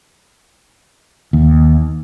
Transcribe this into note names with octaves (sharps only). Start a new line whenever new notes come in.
D#2